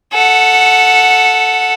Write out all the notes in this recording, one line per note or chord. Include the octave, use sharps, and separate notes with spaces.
A4 F#5